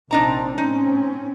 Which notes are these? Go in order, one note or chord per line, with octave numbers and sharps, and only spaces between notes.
A#1 C3 C4 D4 D#4 A#5
A2 C4 C#4 D#4